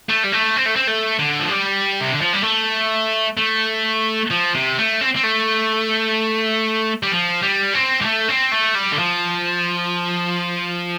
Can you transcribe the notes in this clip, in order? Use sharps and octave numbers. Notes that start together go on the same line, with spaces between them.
A3
G3
A3
C4
A3
C4
A3
D3
F3
G3
C3
D3
F3
G3
A3
A3
F3
C3
A3
C4
C4
A3
G3
F3
G3
C4
G3
A3
C4
A3
G3
D3
F3